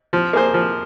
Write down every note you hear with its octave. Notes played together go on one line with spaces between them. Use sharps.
F3
A#3 G#4 C5
F3